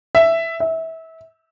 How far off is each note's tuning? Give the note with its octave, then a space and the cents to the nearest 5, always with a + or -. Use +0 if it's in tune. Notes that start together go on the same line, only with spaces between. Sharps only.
E5 +5
E5 -25